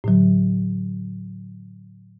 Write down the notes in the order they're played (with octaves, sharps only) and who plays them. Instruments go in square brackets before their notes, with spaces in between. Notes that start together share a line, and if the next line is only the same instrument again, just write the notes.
[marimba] A2 D3 F#3